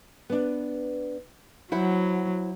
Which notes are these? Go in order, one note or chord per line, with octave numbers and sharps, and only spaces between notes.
B3 D4
F#3 E4 C5 F#5